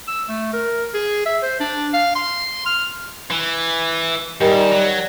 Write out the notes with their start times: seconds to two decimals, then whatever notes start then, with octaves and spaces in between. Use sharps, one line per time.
0.08 E6
0.29 A3
0.53 A#4
0.94 G#4
1.26 E5
1.43 C5
1.60 D4
1.94 F5
2.15 C6
2.66 F6
3.31 E3
4.41 G#2 D#3 G3
4.72 F#3